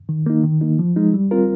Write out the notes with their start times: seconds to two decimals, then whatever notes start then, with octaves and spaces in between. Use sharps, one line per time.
0.09 D#3
0.26 A#3 D#4
0.44 D#3
0.61 A#3 D#4
0.79 F3
0.96 G#3 D#4
1.14 G3
1.31 C4 F4 A#4